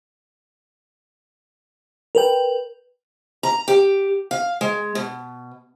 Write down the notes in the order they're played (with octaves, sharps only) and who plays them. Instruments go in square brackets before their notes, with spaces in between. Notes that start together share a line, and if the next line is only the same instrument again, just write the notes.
[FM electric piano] A#4 B4 G5
[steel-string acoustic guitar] A#5
G4
F5
G#3
B2